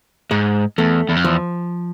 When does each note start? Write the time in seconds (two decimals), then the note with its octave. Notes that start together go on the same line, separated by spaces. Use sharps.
0.31 G#2 G#3
0.78 E2 A3
1.09 E2
1.16 F2
1.24 E2 F3